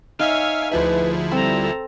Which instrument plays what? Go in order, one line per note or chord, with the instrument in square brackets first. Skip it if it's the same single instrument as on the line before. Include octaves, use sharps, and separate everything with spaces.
[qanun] D#4 [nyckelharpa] C#5 G#5 [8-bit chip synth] E5 F5 F6
[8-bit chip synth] D2 F3 E4 [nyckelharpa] G#4 [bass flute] B4
[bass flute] G3 [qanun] C4 [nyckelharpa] A4 A#5